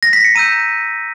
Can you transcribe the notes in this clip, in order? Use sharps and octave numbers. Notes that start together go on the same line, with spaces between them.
A#6
B6
C#7
A#5 E6 G6 D#7